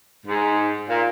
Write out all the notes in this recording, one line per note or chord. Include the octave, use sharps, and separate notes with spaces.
G#2
A#2